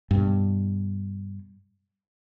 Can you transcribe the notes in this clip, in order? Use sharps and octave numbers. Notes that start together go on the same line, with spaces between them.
G2 B2